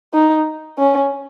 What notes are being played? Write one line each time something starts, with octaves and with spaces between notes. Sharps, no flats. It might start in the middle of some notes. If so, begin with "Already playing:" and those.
D#4
C#4